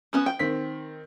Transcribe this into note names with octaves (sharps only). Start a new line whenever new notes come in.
B3 C#4 F#4
G5
D#3 C4 B6